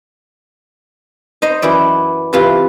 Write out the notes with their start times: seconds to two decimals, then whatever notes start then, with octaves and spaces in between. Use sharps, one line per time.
1.42 D#4 C5 D#5
1.62 F#2 E3 E4 D5
2.33 C3 E3 F4 B4 F5